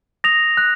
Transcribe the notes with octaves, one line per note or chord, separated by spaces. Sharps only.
D#6 A#6 F7
F#6